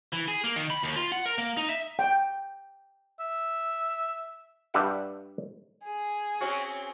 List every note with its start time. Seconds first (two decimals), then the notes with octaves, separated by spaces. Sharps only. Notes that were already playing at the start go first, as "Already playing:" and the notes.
0.13 E3
0.28 G#4
0.44 A#3
0.56 D#3
0.70 B5
0.83 D#2
0.96 F4
1.12 F#5
1.26 A#4
1.38 A#3
1.57 D#4
1.69 E5
1.99 G5
3.20 E5
4.74 G2 G3 E5 F#5 G5
5.84 G#4
6.41 C4 C#4 F#4